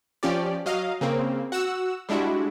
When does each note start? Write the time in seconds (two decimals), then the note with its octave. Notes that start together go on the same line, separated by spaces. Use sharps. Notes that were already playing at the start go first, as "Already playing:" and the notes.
0.23 F3 C#4 G4 D5
0.66 F#3 D#5 F5
1.01 C#3 A#3 C4
1.52 F#4 F#5 E6
2.09 G3 G#3 D4 E4 F#4